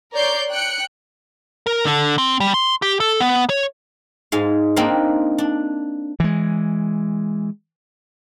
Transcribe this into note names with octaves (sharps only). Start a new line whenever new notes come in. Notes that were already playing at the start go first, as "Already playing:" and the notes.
A#4 C#5 D5 G6 C7
G5 F#6 C#7
A#4
D3
C4
G3
C6
G4
A4
B3
C#5
G#2 G#3 F5
A#3 C4 D4 D#4 A#4 F5
D4
E3 G#3